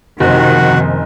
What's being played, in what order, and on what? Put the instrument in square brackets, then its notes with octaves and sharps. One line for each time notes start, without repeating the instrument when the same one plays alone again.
[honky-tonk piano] F#1 [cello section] C3 D#3 F3 [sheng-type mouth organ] F#4 F#5